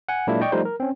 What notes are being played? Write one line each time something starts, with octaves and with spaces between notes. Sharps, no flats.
F#5 G#5
A#2 F#3 G#3 A#3 D4 E4
D5 D#5 G5 C#6
F3 G3 A3 D#4 C5
A#4
C4 C#4